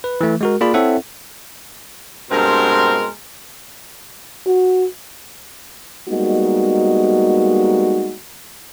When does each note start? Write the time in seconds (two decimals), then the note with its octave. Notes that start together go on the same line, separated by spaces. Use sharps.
0.04 B4
0.21 E3 A3
0.41 G#3 F#4 A#4
0.61 A#3 F4 G#4 D5 B5
0.74 C4 E4 A4 C#5 E5 F#5
2.31 G2 B2 G#3 C4 A#4
4.47 F#4
6.09 G3 G#3 A#3 B3 D#4 F#4